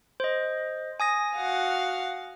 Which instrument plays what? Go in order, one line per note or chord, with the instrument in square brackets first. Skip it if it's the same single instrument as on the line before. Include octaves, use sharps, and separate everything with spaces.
[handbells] C5 D#5
G#5 D#6 A#6
[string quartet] F#4 F5 F#5